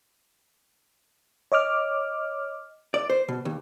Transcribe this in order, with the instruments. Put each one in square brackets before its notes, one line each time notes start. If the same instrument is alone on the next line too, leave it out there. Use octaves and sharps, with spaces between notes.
[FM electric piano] C#5 D#5 D6 F6
[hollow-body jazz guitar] D5
C5
B2
D#2